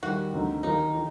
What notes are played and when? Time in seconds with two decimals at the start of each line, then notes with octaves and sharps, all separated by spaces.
0.03 D#2 D#3 G3 F#4
0.33 D2 D3 F#3 C4 D#4
0.63 D#2 D#3 F#3 A#3 D#4
0.95 D#3